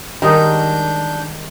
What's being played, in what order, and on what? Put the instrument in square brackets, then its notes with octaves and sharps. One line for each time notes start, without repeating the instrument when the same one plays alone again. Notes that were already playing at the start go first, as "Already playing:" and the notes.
[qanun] D#3 [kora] G3 G#3 D#4 [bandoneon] D4 G6 [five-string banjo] A#4